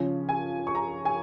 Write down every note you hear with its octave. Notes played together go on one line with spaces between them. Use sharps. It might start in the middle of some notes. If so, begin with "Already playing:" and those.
Already playing: C#3 F3 C#4
G#5
C#6
A#5
G#5